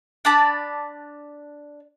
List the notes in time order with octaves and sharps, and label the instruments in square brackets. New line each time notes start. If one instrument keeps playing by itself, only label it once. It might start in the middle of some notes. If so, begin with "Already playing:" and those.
[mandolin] D4 D5 A5 B5